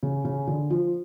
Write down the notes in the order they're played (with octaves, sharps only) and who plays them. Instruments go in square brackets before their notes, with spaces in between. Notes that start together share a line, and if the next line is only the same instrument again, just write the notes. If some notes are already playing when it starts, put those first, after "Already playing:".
[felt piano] C#3
C#3
D3
F3